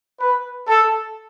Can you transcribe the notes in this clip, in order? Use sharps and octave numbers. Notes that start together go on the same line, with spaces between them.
B4
A4